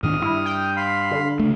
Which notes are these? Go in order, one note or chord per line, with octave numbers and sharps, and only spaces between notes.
G#2 D#3 D4 D#6 F6
G2 E4
G5
F5 B5 C6
D3
C#3 A3